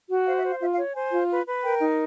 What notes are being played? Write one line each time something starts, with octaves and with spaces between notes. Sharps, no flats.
F#4
C5 F5
E5
C5
F5
F4 E5
F5
C#5
C5 G#5
F4
B4
B4
A#4 G5
D#4